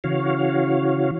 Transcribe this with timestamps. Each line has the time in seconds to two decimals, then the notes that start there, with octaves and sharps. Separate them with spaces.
0.04 C#3 E3 F#4 C#5 F5